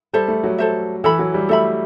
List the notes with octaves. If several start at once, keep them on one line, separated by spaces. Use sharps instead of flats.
G3 A4 C5 E5
A3
F#3
A4 C5 E5
E3 A4 E5 B5
F#3
G3
A3 A4 E5 B5